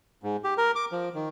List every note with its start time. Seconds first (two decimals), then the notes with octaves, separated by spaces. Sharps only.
0.23 G#2
0.44 G4
0.58 A#4
0.76 D6
0.92 F3
1.14 D#3